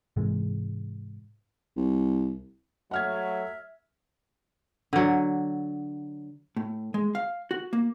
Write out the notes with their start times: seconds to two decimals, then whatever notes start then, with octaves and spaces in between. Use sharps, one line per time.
0.17 G#2 C3 E3 G#3
1.77 C2
2.91 F#3 A3 E5 F#5 F6 G#6
4.93 D3 F#3
6.56 A2
6.94 G#3
7.15 F5
7.51 F#4
7.73 A#3